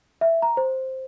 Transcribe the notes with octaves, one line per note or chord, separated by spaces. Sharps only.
E5
A#5
C5